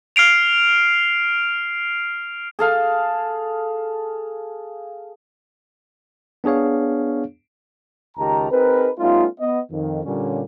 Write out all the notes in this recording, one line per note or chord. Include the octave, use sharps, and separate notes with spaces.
F6 C7 D7 F7
G#4 A4 F5
B3 D4 G#4 C#5 F5
C#2 D#3 G4 A5 A#5
C4 D#4 G#4 A#4 B4
G3 A3 B3 C#4 D#4 F4
B3 D#5
F2 D#3
A#2 D3 G3 C#4